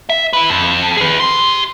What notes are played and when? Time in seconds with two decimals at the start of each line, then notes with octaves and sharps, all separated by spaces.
0.09 E5
0.33 E4 B4
0.50 F2
0.97 G#4 B4
1.20 G4 C6